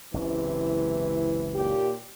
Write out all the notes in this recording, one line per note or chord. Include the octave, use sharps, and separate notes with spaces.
F#1 C#2 G#2 C3 E3 C#4 E4
D#2 A#2 G4